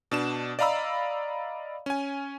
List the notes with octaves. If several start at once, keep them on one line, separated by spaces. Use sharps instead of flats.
B2 D4 E7
D5 D#5 F5 A#5 B5 E6
C#4 G#5